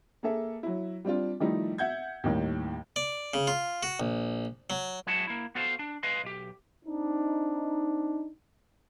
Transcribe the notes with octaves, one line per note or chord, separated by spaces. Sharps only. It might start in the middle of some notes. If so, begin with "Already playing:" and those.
A#3 G#4 A4 E5
F#3 E4
G3 C4 D4 F4
D#3 F3 G3 A3 D#4 E4
E5 F#5 G6 G#6
D#2 A2 D#3 G3
D5
C#3
F4
F#4
A#1
F#3
F#3 G#3 E4 F#4 A5
A#3 E4
B3 F#4 A4 C5 F5
D4
B4 D#5 F5 C6
B1 G4
C4 D4 D#4